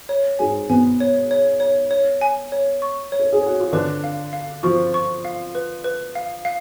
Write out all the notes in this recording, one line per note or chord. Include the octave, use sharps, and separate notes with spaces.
C#5
G#2 G#3 G#5
B2 B3 G#5
C#5
C#5
C#5
C#5
G#5
C#5
C#6
C#5
A4
G#4
F#4 C#5
F4
D3 D4 B4
F5
F5
F3 F4 C#6
C#6
F5
B4
B4
F5
F5